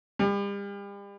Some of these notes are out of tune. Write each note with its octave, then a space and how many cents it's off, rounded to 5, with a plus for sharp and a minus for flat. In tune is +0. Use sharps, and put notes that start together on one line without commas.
G3 +40